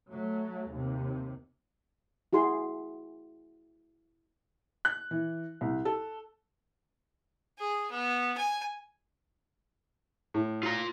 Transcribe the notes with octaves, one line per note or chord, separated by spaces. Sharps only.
F#3 A3
D#2 C3
E4 F#4 G#4 C6
F#6
E3
C2
A4
G#4
B3
G#5
A2
F4 A#5